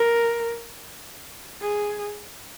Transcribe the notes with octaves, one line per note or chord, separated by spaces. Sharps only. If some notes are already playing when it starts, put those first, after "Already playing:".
Already playing: A#4
G#4